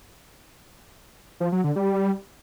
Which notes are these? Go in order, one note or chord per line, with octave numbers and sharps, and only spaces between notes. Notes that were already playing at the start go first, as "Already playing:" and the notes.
F3
F#3
D3
G3